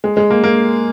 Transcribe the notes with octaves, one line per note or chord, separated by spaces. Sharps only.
G#3
G#3
A#3
A#3